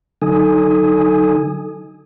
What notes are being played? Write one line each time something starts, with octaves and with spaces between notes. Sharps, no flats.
D3 F#3 D#4 A4 G#5 D#6